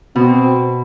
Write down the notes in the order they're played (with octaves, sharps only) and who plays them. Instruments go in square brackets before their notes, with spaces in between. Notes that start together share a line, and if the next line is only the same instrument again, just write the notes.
[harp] B2 [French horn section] C4